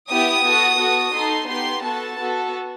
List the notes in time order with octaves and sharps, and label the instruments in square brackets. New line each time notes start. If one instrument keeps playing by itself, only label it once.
[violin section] B3 E4 G4 D#6
B3 F#4 A4
B3 F#4 A4
D#4 A4 C6
B3 D#4 G4 C6
B3 F#4 A4 A5
B3 F#4 A4